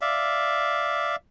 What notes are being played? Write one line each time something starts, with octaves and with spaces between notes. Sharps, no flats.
D5 E5 F5